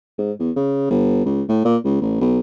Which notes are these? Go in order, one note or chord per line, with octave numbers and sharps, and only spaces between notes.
G#2
E2
C#3
G1
C#2
A2
A#2
C#2
A1
B1